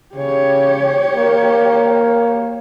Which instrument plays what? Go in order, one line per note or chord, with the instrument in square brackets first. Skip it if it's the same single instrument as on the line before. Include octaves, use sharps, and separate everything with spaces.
[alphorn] C#3 [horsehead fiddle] G4 C#5
[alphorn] A#3